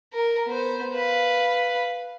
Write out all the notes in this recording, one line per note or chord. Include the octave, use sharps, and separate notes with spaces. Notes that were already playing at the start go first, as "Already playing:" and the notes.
A#4
B3 C5
B4 F5